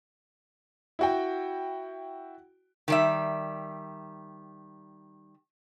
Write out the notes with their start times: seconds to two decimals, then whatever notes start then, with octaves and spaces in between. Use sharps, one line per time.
0.99 E4 F#4 G5
2.88 D#3 G3 E5